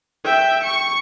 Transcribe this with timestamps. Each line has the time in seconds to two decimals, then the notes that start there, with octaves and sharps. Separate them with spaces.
0.24 E5 G5
0.63 C#6 C#7